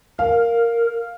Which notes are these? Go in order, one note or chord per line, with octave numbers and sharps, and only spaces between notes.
A#4 F5